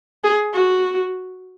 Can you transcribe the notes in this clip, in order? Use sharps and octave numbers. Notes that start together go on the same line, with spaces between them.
G#4
F#4